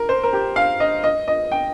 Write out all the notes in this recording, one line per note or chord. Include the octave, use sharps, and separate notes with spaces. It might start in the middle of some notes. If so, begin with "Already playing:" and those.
Already playing: A#4
C5
A#4
G4
F5
D#5
D#5
D#5
G5